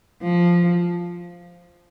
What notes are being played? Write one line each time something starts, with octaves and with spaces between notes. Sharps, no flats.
F3